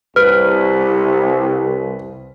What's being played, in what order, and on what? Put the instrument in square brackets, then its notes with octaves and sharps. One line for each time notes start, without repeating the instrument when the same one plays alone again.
[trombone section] C2 [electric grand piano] B4 [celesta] F6